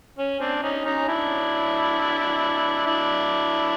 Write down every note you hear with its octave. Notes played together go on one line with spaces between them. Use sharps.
C#4
C4 D4
C#4 D#4
C#4 D#4
D4 E4
D4 E4